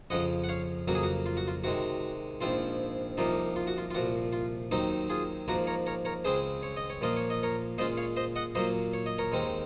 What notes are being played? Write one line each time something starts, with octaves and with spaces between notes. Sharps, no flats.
F2 C#3 F3 D#5 F#5
F#5
C#5 F5
F2 C#3 F#3 A#3 F#4
G#4
F#4
F4
F#4
F4
C3 D#3 G#3 F#4
A#1 G#2 F3 C4 F4
C2 C3 F3 A#3 D#4 F4
F4
F#4
F4
F4
C2 A#2 F3 F#4
F4
D#2 D#3 F#3 C4 D#4
F4 G#4
G#2 F3 A#3 F#4 A#4
A#4 C#5
A#4 C#5
A#4 C#5
C#2 C#3 G#3 C4 G#4 C5
C#5
D#5
C#5
A#2 F3 A#3 F4 D#5
C#5
D#5
A#4 C#5
A#2 G#3 C#4 F4 C5 D#5
C#5 F5
C5 D#5
D#5 F#5
A#2 F#3 A#3 C5 D#5
C#5
D#5
A#4 C#5
D#2 D#3 G#3 C4